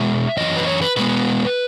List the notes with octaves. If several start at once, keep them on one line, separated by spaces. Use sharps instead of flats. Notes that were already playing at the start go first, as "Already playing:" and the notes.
Already playing: B2 G#3 E5
F#2 E3 C#4 D#5
B4
C#5
B4
B2 G#3 B3 B4